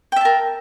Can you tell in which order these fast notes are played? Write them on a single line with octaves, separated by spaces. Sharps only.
G5 E5 A5 A#4